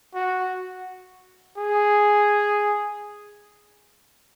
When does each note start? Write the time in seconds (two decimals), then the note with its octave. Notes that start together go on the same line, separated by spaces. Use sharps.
0.15 F#4
1.58 G#4